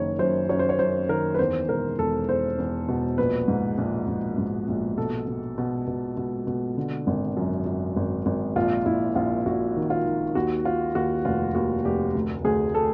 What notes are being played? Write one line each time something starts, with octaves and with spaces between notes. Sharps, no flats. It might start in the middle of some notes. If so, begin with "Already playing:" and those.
Already playing: F#1 D#3 C#5
F#2 C5
F#2 C#5
C5
C#5
F#2 C5
D#3 A#4
B4
E2 C5
E1 A#4
E1 A4
E2 C5
E2
B2
A#1 B4
G#2
A#1
A#1
G#2
A#1
B2 A4
B2
B2
B2
B2
B2
D3
G#1
F#2
F#2
G#1
G#1
A#1 F4
A#1 E4
A#1 F4
A#1 F#4
D#3
F4
D#3
D#2 F#4
D#3 F4
D#2 F#4
F1 F4
D#2 F#4
F1 G4
D2
D2 G#4
A4